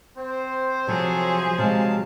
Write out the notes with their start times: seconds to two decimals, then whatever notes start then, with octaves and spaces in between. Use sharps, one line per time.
0.17 C4 C5
0.87 C3 F3 F#3 G#4 A4 C#5
1.58 C3 F#3 G#3 F5 A5